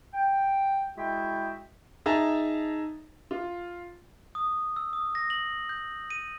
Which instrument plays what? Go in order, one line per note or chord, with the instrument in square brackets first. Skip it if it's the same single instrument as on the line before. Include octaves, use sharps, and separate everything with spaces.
[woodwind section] G5
G#3 E4 F#4 G#4 E5 G5
[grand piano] D#4 G#4 E5 A5 A#5
F4
[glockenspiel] D#6
E6
D#6
A#6
F#7
G6
D#7